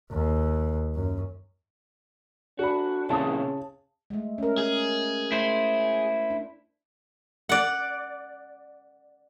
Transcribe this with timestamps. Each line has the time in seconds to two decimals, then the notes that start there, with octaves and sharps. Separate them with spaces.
0.11 D#2
0.95 F#2
2.59 D4 F#4 A4 B5
3.10 A#2 C#3 C4 E4 A5 D#6
4.10 G#3 A3
4.38 C#4 A#4
4.58 G#4
5.32 A3 E4 C5
6.30 D4
7.49 D5 F#5